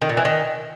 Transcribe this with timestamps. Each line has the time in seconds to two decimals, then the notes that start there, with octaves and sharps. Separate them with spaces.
0.02 D#3
0.09 A#2
0.17 E3
0.25 D#3